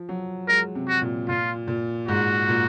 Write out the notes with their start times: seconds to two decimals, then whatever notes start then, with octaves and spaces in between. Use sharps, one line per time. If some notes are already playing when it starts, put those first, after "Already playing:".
Already playing: F3
0.09 F#3
0.48 G#3 A#4
0.75 C3
0.88 F#4
1.02 A#2
1.28 A#2 F4
1.68 A#2
2.08 G#2 F#4
2.48 A#2